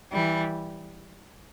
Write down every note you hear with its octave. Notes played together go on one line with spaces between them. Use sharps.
E3 G3